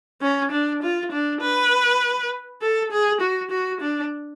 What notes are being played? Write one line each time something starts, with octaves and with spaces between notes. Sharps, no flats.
C#4
D4
F4
D4
B4
A4
G#4
F#4
F#4
D4